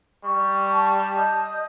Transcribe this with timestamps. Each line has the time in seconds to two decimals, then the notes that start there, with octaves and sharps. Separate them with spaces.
0.24 G3 C#6
0.70 A5
1.16 D#5 D#6 G6